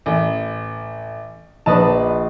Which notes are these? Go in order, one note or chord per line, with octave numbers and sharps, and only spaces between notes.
A1
A#1 D4 B4 D#5 A5 D#6